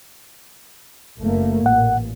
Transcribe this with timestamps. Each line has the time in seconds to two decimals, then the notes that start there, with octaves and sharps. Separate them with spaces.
1.20 F#1 A3 A#3
1.66 A1 A#2 F#5